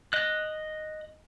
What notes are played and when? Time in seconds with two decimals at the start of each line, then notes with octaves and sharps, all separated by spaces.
0.13 D#5 F#6